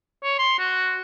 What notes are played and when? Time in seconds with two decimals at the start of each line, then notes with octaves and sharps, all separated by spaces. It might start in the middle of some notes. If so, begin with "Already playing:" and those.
0.23 C#5
0.39 C6
0.59 F#4